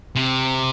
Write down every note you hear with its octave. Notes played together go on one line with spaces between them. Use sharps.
C3